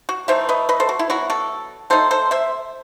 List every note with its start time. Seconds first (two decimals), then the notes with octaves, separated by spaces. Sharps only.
0.09 F#4
0.28 E3 A3 D#4 C5 E5
0.49 B4 D#5
0.69 B4 D#5
0.80 A4 C5
0.89 F#4
0.99 E4
1.10 F#3 B3 E4 F#4
1.30 F#4 A4
1.90 F#3 A3 D#4 A4 C5
2.11 A4 C5
2.31 C5 E5